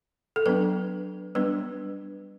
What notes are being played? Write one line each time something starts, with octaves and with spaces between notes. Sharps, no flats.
A4
F#3 B3 D4 B4
G3 B3 D4 B4